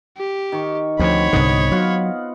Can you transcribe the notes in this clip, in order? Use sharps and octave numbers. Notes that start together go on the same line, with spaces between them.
G4
D#3 C#6
D2 F3 C4 C5 C#5 F#5 B5
C2 G#2 D3 B3 D#5
F#3 F4 F5 F#5